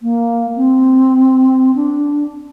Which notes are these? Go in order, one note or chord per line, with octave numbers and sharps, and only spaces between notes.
A#3
C4
D4